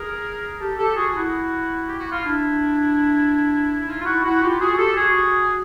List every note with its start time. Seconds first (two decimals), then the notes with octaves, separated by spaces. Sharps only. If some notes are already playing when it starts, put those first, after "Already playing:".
Already playing: G#4 A#4
0.59 G4 A4
0.78 G4 A4
0.96 F#4 G#4
1.14 E4 F#4
1.86 G4
1.99 F#4
2.11 F4
2.23 D4 E4
3.87 D#4 F4
4.01 F4
4.05 E4 F#4
4.24 E4 F#4
4.42 F4 G4
4.60 F#4 G#4
4.77 G4 A4
4.96 F#4 G#4